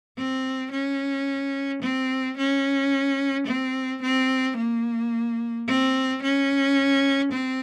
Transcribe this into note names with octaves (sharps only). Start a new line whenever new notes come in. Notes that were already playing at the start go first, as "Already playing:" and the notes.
C4
C#4
C4
C#4
C4
C4
A#3
C4
C#4
C4